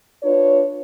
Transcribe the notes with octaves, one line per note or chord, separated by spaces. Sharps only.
D4 F4 B4 C#5